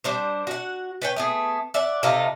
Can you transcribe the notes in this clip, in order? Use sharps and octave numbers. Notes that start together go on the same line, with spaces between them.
G3 D4 C5
F#4 F#5
B4 C#5 G5
A3 B3 G#4
D5 E5 F#5
C3 D#4 F4 A4